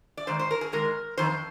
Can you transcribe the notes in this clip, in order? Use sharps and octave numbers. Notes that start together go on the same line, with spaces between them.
D5
G#2 D#3 C5
C5
A#4
G#4
G#2 D#3 G#3 A#4
F2 D#3 C5